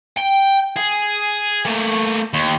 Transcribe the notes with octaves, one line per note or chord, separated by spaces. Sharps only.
G5
G#4
A3 A#3
D#2